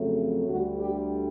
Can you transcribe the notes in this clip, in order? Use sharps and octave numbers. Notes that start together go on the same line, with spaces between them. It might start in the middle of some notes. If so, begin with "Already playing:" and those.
Already playing: F2 C#3 F#3 A3
D2 D3 G3 F#4
G4